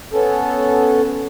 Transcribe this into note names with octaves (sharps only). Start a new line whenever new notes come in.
B3 C#4 A4